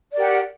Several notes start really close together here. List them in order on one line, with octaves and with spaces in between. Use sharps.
D5 A#4 G4 F#5